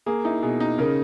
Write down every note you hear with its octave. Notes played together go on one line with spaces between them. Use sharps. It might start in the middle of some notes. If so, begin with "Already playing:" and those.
A#3 G#4
D#4 E4
B2 G#4
D#4
C#3 A#4